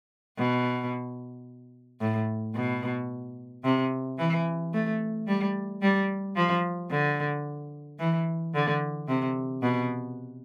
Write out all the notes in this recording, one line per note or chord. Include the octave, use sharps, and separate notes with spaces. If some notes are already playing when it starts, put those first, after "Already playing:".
B2
A2
B2
C3
E3
A3
G3
G3
F3
D3
E3
D3
C3
B2